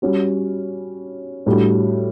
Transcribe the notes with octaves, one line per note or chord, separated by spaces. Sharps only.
G3 C#4 F#4
A2 G3 D4 F#4